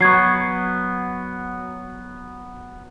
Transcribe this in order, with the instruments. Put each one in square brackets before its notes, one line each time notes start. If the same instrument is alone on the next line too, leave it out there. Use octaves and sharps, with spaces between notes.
[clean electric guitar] F#3 B3 [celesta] C#6 G#6 C7